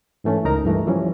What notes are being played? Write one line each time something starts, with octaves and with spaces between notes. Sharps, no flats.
G#2 E3 A3 C#4
C#2 D#4 A#4 A#5
G2 E3 A3
E3 F3 G3 C#4